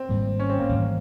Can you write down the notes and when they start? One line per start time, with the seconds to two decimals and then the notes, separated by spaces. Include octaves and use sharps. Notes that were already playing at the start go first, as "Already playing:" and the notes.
Already playing: C4
0.09 G#1 G#2 G3 A#3
0.39 C#4
0.50 C4
0.59 A#3
0.69 G#1 G#2 E3 G3